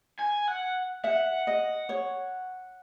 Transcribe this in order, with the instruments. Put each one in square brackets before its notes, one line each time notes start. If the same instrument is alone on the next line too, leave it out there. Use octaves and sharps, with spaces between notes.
[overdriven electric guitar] G#5
F#5
[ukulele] E5 [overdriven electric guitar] F#5
[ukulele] D#5
C#5